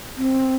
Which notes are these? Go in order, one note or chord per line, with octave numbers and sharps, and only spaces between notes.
C4